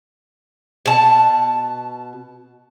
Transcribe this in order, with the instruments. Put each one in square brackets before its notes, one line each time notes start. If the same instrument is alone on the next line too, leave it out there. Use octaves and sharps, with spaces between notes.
[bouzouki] B2 A5